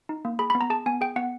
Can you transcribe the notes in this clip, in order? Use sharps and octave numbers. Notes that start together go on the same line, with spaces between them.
D#4
A#3
G#4 B5
B5
B3
A#5
G#4 A5
B3 G#5
G#4 G5
B3 F#5